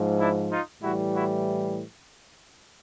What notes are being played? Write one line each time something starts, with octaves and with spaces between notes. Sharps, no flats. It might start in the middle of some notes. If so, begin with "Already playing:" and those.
Already playing: G#2 F3
D4 E4
D#4 F4
A2 E3 G3 E4 F#4
E4 F#4